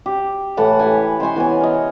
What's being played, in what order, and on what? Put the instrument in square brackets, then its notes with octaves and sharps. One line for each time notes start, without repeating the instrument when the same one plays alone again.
[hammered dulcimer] G4
A2 E3 F#5 A5
G4 B4 F#5 G#5
C5 D#5 G#5 C#6
E3 B3 C#5 G#5
A#4 D#5